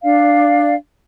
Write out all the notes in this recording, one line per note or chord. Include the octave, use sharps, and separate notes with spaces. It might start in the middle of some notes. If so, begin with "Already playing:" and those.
D4 D5 F5